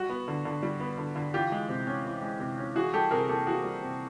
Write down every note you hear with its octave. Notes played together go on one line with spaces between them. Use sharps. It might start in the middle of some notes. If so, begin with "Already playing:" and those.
Already playing: G3 F#4
B3
D3
D3
G3
B3
D3
D3
E3 F4 G4
G#3
C3
C#4
E3
G#3
C3
C#4
E3 F#4 G#4
G3 G4 A4
C3 G#4 A#4
A#3 G4 A4
E3 F#4 G#4
G3
C3